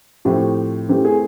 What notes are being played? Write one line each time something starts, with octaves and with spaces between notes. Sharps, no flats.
A2 F3 A3 C4 G4
E3 A3 C4 G4
G#4